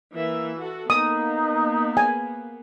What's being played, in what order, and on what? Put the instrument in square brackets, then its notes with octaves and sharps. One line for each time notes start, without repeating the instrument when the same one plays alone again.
[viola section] E3 A#3 E5
F#4 A4
[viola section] A#3 B3 [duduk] D#4 [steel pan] D#6
[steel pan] G#5